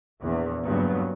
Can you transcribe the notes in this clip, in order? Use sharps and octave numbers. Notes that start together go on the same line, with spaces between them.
A#1 E2
F#1 G2 C#3 F#3 B3